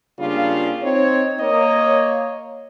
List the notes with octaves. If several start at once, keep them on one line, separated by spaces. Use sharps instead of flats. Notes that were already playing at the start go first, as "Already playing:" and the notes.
C#3 G3 A#3 D4 F4
C4 D#4 C#5
A#3 C#5 D#5